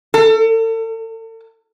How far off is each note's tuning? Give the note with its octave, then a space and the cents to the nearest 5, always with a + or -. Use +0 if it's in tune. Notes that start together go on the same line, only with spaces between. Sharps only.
A4 +40